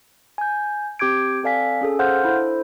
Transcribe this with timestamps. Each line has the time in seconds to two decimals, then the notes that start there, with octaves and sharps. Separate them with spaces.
0.38 G#5 G6
0.99 C4 G4 D6 G6 G#6 D7
1.43 C4 A4 D5 F5 G#5 B6
1.81 C#4 G#4 A4
1.99 C5 F5 F#5 C6 F6 G6
2.23 D4 E4 A4 C5